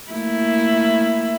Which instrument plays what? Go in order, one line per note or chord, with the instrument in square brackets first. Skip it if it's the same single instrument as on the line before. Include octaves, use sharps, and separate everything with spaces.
[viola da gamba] A3 A#3 E4